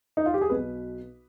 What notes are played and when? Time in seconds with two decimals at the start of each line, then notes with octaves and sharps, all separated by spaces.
0.17 D#4
0.26 F4
0.34 G4
0.41 G#4
0.50 B1 B2 B3 B4